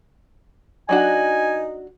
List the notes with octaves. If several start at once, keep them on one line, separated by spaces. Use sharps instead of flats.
F#3 D4 D#4 F#4 G#5